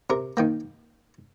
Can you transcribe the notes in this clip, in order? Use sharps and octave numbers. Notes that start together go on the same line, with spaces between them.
C3 A#4
D#3 A#3 G5